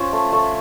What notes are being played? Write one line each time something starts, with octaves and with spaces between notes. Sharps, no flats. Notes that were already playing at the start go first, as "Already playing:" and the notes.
Already playing: C#4 F4 C5
A3
A3